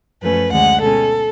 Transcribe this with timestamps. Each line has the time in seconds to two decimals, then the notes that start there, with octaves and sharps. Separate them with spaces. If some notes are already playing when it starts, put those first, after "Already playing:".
0.22 F#2 F3 A3 C#4 B4
0.52 D2 D3 G#3 C#4 F#5
0.81 B2 G#3 C#4 A4